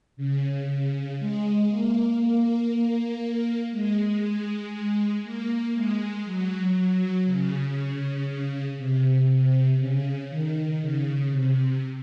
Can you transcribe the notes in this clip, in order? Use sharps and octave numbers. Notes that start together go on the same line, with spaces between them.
C#3
C#3
G#3
A#3
A#3
G#3
A#3
G#3
F#3
F#3
C#3
C3
C#3
D#3
C#3
C3